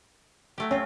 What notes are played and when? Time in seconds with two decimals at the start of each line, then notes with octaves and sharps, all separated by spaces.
0.58 F#3 A3 G4
0.71 C4 C#4 F4